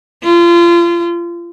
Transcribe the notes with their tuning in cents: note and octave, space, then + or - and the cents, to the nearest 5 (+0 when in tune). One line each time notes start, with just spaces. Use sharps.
F4 -30